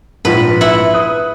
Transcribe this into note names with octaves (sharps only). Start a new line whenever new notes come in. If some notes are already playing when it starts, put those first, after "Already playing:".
A#1 G#2 B4
E4 F#5
B4 D#6